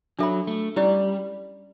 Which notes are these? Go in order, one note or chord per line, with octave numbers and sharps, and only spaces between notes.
F#3 D4 A4 E5 B5
A3
G3 C#4 E4 G4 D5